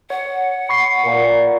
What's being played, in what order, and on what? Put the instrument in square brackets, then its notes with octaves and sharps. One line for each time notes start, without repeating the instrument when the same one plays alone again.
[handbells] C#5 [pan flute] F#5
[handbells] B5 C#6 C7
[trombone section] A#2